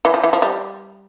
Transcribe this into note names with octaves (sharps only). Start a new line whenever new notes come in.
E3
F3
E3
F3
G3